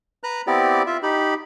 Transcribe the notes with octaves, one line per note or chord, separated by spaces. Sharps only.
B4 A#5 F#6
B3 C4 E4 G4 D5
F4 E5
D#4 G4 B5